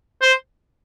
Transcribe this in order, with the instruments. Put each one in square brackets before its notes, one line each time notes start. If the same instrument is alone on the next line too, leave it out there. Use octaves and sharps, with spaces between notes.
[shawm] C5